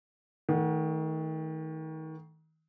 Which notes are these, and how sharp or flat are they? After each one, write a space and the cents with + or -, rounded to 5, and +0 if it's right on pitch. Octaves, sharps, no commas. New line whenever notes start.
D#3 +30 A3 +0 F#5 +0